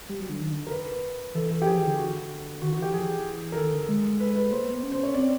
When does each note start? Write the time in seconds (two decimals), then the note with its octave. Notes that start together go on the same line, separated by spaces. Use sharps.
0.09 G3
0.20 F#3
0.29 D3
0.40 D#3
0.51 D3
0.67 A#4
0.71 B4
1.35 E3 A4
1.51 A4
1.62 G4
1.66 F3 G#4
1.78 E3
1.83 D3 G4
1.98 F#4
2.61 D#3 F#4
2.73 F#4
2.78 E3 G4
2.93 F3 G#4
3.10 E3
3.52 A#4
3.56 D#3 A4
3.73 D3
3.89 G#3
4.20 G#3 B4
4.36 B4
4.51 A#3 C5
4.62 B3
4.73 B3
4.83 C#4
4.92 C5
5.03 C#4 C#5
5.14 C4 D5